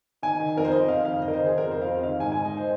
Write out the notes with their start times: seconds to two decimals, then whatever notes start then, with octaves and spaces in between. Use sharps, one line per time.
0.22 D#3 G#5
0.40 D#3
0.56 F2 A#4
0.65 C5
0.72 F2 D#5
0.88 D#3 F5
1.05 F2 F5
1.21 D#3 D#5
1.28 A#4
1.34 D#3 C5
1.46 G#4
1.55 F2 A#4
1.71 F2 C5
1.82 F5
1.87 F2 D#5
2.03 D#3 F5
2.20 G#2 G#5
2.32 D#3 G#5
2.45 D#5
2.53 D#3 C5